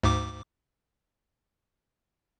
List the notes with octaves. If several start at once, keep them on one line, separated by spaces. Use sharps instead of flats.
D2 G#2 D6